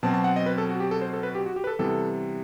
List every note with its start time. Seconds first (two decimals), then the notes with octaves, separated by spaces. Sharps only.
0.03 B2 F#3 C4 A5
0.14 A5
0.24 F#5
0.36 D#5
0.46 B4
0.58 A4
0.69 F#4
0.80 G4
0.91 A4
1.02 C5
1.13 A4
1.23 B4
1.35 G4
1.46 F#4
1.56 G4
1.64 B4
1.67 A4
1.79 C3 E3 G3 B3 A4